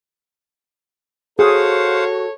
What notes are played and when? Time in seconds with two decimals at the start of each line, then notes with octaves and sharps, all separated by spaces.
1.39 F#4 G#4 A4 C5 C#5 F5 F#5